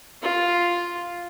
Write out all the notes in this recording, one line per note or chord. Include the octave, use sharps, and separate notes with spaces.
F4